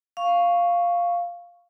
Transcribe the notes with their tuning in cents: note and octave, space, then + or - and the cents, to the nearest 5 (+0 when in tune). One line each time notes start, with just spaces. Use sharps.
F5 +0 C#6 +0